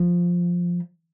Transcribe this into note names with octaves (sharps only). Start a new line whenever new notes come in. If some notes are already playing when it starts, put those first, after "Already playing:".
Already playing: F3